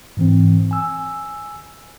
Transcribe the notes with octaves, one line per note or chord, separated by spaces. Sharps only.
G#2 E3 C4
G#5 E6